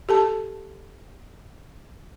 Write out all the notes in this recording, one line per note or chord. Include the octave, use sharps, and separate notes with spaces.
G4 A4 A5